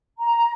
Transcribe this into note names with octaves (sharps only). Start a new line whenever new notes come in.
A#5